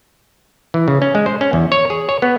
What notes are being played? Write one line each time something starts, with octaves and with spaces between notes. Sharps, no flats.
E3
C#3
C#4
G#3
C5
C#4
E2
C#5
G#4
C#5
B3